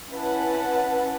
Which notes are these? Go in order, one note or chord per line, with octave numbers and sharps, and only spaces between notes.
C#4 E4 B4 F#5 A5